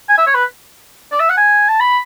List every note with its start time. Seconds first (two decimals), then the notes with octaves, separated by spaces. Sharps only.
0.09 G#5
0.18 E5
0.27 C#5
0.35 B4
1.12 D5
1.20 E5
1.29 F#5
1.37 G#5
1.68 A5
1.80 B5